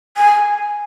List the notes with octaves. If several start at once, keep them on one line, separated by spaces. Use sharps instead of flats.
G#5